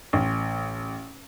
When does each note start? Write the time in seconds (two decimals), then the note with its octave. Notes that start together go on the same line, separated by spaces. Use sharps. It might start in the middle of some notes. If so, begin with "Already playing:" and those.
0.13 A1